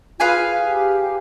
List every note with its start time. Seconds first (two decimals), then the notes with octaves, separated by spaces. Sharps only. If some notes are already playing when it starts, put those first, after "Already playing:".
0.20 F4 G#4 B4 F5 G#5
0.63 G4